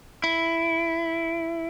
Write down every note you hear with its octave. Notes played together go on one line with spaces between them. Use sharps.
E4